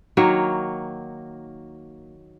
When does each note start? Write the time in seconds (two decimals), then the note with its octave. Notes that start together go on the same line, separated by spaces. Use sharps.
0.17 D#3 F#3 A#3 C#5